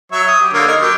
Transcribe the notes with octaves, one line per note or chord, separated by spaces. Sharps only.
F#3 C#5 E5
D#6
G4
D3 A#3 C#5
D#4 A#4
F#3 G4